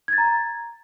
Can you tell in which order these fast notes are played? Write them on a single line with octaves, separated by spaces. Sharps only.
G#6 A6 A#5